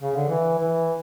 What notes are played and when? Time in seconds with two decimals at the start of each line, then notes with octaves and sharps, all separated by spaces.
0.02 C#3
0.16 D3
0.29 E3
0.59 E3